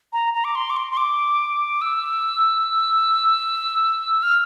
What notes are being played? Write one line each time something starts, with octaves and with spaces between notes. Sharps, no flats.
A#5
A#5
D6
C6
D6
C6
C6
D6
E6
F6